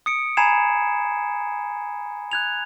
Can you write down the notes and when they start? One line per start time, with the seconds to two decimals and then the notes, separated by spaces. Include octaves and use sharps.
0.06 D#6 C#7 D7
0.37 G#5 A#5 B5 G#6 C7 E7
2.31 F#6 G#6 F7